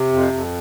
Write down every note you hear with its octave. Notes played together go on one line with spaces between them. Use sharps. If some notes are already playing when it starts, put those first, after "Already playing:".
Already playing: C3
F2
F2